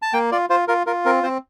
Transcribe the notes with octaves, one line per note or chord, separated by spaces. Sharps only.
A5
A#3 G5
F4 D5
F4 C5
F4 A#4
F4 A#4
C4 A#4
C4 C5